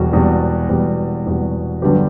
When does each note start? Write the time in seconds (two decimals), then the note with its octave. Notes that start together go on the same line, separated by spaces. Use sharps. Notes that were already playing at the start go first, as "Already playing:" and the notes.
Already playing: E1 E2 B2 G3 F#4
0.12 E1 E2 B2 G3
0.69 E1 E2 B2 G3
1.26 E1 E2 B2 G3
1.82 G1 G2 D3 F#3 G4 B4